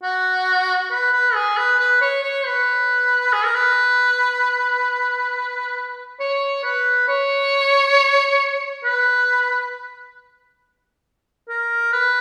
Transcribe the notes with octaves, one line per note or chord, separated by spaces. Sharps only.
F#4
B4
B4
G#4
B4
B4
C#5
C#5
B4
G#4
A#4
B4
C#5
B4
C#5
B4
A#4
B4